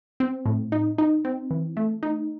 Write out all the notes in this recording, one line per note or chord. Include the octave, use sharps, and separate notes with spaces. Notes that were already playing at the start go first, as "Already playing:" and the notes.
C4
A2
D#4
D#4
C4
E3
A3
D#4